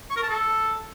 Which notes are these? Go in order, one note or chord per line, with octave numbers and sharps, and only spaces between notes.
C#6
A#4
A5
A4